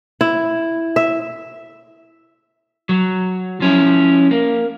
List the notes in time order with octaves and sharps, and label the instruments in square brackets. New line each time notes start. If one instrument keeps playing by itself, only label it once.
[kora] E4
E5
[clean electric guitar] F#3
F3 C#4 E4
A#3